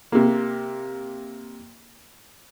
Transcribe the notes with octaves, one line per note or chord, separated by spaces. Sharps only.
C3 A#3